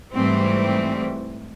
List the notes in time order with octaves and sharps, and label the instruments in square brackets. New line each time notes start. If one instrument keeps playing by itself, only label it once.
[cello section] G#2 E3 G3 A3 C4